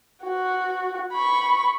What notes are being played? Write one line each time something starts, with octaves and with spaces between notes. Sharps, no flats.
F#4
B5 C#6